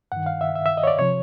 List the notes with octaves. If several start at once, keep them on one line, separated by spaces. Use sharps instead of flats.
G2 D#3 F#5
F5
E5
E5
E5
D#5
C#5
D5
C3 F3 C#5